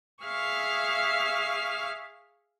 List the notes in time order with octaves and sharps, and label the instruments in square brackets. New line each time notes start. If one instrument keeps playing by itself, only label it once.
[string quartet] G#4 E5 F5 C#6 F6